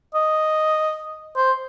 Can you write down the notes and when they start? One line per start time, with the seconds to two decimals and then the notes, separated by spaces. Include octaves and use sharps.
0.15 D#5
1.37 C5